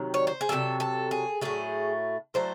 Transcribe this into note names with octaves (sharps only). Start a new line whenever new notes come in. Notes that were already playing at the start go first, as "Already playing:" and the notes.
Already playing: C3 D#3 F#3
C#5
C5
G#4
C3 D#3 F#3 A4
A4
G#4
A2 F#3 A3 G#4
A2 F#3 A3 C5